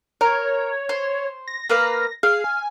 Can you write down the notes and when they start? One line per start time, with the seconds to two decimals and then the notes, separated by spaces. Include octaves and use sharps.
0.21 A#4 C#5
0.89 C5
1.48 A#6
1.69 A#3 B4 F5
2.23 G#4 F5
2.44 G#5